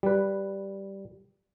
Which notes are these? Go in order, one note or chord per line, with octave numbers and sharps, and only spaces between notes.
G3 B4